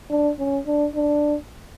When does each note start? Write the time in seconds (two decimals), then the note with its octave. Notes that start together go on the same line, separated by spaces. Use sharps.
0.10 D4
0.39 C#4
0.67 D4
0.95 D4